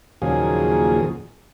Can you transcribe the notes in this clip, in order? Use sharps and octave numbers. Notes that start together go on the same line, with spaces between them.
D#2 A#2 C#3 F3 F#3 G#4